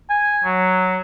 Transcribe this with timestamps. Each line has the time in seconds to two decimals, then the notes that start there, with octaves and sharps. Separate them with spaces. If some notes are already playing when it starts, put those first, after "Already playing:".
0.10 G#5
0.44 F#3